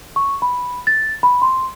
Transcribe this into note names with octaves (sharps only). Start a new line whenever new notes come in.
C#6
B5
A6
B5
C6